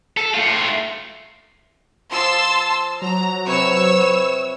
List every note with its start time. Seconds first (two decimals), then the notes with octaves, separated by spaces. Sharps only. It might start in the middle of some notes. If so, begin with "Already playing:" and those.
0.17 A4
0.35 A3 F4
2.12 F3 A5 C6 E6
3.02 F#3 A#5
3.47 C3 B4 C#5 E6